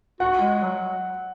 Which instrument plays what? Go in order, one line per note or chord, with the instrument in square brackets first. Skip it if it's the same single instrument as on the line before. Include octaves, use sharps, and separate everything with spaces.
[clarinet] F#4 [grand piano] F#5
[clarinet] G#3
F#3